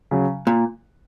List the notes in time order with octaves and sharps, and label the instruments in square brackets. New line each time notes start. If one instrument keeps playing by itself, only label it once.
[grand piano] C#3 F#3
[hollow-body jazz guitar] A#2